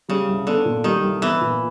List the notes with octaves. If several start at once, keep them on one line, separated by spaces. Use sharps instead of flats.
C#3 G3
C2
D3 B3
A#2
D#3 G3
C2
E3 B3
A#2